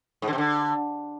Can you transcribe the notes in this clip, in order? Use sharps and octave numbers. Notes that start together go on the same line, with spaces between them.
G#2
D3
C3
D3